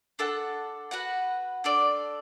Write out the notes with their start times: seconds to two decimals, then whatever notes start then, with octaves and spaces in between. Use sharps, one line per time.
0.19 D4 A4 F#5 A5
0.91 F#4 B4 F#5
1.64 D4 A4 D5